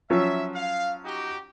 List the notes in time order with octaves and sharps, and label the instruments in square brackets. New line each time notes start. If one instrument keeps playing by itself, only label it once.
[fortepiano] F3 F#3 C#4 [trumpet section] E5
[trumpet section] F5
D#4 F#4 G4